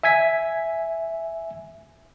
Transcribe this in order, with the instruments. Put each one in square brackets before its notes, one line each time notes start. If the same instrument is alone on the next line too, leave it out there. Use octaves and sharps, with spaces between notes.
[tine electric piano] E5 G#5 G#6 B6